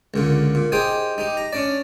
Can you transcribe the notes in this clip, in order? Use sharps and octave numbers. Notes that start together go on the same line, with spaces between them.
C#2 A#2 D3
A#2
D#4 G4 G#4 C5 G5
D#4 G4
A#5
C#4 D4 D5